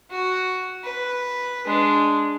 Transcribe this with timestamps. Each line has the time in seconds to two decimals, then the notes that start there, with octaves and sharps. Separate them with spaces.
0.10 F#4
0.84 B4
1.66 G#3 D4